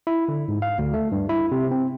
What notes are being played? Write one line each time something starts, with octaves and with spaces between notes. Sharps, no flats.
E4
D3
G#2
F5
D2
A3
G2
E4
C3
C4